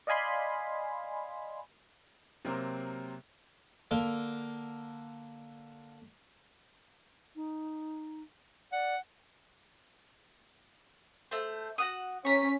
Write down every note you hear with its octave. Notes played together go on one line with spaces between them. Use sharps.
D5 D#5 F5 G#5 B5 C6
C3 F#3 A#3 C4 A#4 C5
D3 A#3
D#4
D5 F#5
A3 C5
F#4 F#5 D#6
C#4 A#5 C#6 B6